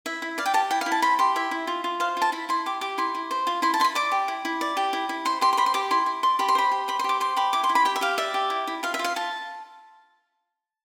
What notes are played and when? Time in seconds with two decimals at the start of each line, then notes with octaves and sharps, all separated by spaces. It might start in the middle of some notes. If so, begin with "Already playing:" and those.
0.06 E4 E5
0.22 E4
0.38 D5 F5
0.46 G5
0.54 G4 A5
0.71 E4 G5
0.81 F5
0.86 E4
0.92 A5
1.02 C5 B5
1.19 G4 C6
1.36 E4 E5
1.51 E4
1.67 F4
1.84 F4
2.00 C5 F5
2.17 F4 A5
2.32 E4 B5
2.49 E4 C6
2.66 G4 D6
2.81 G4 D6
2.98 E4 C6
3.15 E4
3.31 C5
3.47 F4
3.62 E4 C6
3.74 A5
3.80 E4 C6
3.84 B5
3.95 D5 D6
4.12 G4
4.28 E4
4.45 E4
4.61 D5
4.77 G4
4.93 E4
5.09 E4
5.25 C5 C6
5.41 G4 C6
5.53 C6
5.57 C5 B5
5.66 C6
5.74 G4 D6
5.91 E4 C6
6.06 E4
6.23 D5 C6
6.39 G4 B5
6.48 C6
6.55 C5 B5
6.71 G4
6.88 C5 B5
6.99 C6
7.04 G4 D6
7.20 C5 C6
7.36 G4 B5
7.53 E4 D6
7.64 C6
7.69 E4
7.75 B5
7.85 G4 G5
7.96 E5
8.01 G4 F5
8.18 D5 E5
8.34 G4
8.50 E4
8.67 E4
8.83 F4 F5
8.94 E5
8.99 F4
9.04 F5
9.16 F4 A5